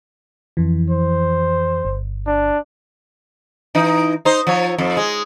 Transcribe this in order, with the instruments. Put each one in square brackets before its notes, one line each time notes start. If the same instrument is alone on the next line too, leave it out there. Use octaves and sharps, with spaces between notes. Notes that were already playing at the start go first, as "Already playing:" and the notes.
[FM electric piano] F2 E3
[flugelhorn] C5
[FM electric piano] G1
[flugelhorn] D4
[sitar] E3 D#4
D#4 C5
F3 C#5
F2
G#3